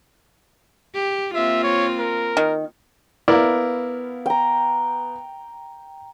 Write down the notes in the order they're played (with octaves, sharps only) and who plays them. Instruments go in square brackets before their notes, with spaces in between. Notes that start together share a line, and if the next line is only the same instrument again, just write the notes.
[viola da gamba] G4
[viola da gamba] A#3 C4 F4 [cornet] E5
[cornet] C#5
A#4
[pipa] D#3
[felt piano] B3 F5 [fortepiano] E4 A#4 D5
[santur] G5 A#5